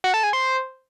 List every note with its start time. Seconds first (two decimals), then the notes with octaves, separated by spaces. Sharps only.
0.04 F#4
0.14 A4
0.23 G#4
0.33 C5